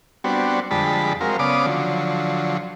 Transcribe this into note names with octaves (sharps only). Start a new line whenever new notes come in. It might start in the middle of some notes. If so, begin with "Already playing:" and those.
G3 B3 C4 D4 F#4
F2 D3 G3 G#3 A5 B5
F#3 G#3 C4 A#4 F5
C#3 B3 D5 F5 D6 D#6
D3 F3 F#3